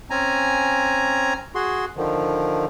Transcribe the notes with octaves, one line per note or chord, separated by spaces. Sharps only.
C4 C#4 G#5 A#5
F#4 G#4 C6
D3 D#3 F3